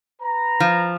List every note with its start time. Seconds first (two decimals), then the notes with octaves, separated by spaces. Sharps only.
0.22 B4 A#5
0.60 F3